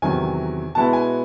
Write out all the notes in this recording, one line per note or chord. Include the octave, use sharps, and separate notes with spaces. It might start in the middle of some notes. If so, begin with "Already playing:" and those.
E2 C3 D#3 F#3 G#5
B2 G#3 B3 E4 A5
G#5